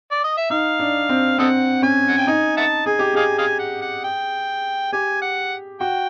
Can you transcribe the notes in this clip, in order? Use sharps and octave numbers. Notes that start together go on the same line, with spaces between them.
D5
D#5
E5
D#4 F5
D4
C4
C4 A4 D#5 F#5
C#4 G#5
F#5
G5
D#4 G#5
E5 F#5 A5
G#4 G#5
G4
G#4 D#5 F5 G#5
D#5 F5 G#5
F#5
F#5
G5
G4 G#5
F#5
F#4 G5